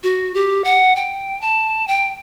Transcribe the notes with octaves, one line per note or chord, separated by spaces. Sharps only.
F#4
G4
F#5
G5
A5
G5